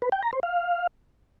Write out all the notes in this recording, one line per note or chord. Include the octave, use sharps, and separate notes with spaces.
B4
G5
A#5
C5
F5